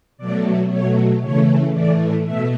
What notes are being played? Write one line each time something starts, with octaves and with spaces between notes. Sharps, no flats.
B2 F#3 A3 D5
B2 F#3 A3 C#5
C#3 E3 A3 C#5
A2 E3 A3 D5
B2 A3 E5